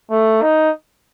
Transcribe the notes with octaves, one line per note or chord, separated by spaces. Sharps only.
A3
D#4